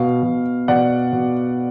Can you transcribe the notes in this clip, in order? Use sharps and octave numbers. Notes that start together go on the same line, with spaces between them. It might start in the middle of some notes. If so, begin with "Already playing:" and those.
Already playing: B2 F5
B2
B2 D5 F#5
B2